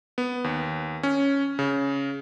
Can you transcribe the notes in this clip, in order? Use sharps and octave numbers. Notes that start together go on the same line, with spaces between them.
B3
D#2
C#4
C#3